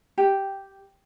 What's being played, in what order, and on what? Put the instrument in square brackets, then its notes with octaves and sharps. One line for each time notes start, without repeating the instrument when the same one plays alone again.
[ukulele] G4